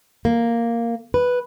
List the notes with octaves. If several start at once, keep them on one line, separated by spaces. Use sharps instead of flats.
A#3
B4